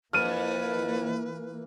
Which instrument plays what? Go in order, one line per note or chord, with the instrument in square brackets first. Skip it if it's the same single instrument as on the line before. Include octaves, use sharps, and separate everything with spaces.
[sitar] F2 [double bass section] E3 A#3 [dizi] B4 [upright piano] F6 D#7